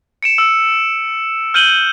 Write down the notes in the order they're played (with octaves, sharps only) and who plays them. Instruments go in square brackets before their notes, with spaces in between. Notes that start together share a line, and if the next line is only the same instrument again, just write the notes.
[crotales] C#7 D7 E7
E6
F6 G6 D#7 F#7 G7